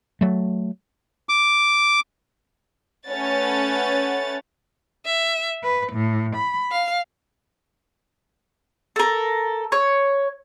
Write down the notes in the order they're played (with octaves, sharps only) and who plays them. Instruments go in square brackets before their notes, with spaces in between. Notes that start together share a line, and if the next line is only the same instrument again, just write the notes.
[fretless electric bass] F#3 A3
[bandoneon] D6
[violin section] A3 C#4 B4 C#5 F#5 A6
[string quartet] E5
B4
A2
B5
F5
[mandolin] A4 A#4
C#5